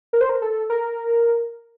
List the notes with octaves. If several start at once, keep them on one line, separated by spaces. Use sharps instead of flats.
A#4
C5
A#4
A4
A#4